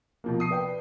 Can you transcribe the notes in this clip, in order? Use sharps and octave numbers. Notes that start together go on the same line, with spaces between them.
B2 F3 A#3
A5 D#6 C7
B4 D5 G5